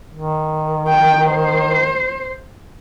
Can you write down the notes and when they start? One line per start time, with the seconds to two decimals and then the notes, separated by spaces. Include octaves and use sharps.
0.14 D#3
0.88 G5
1.31 C5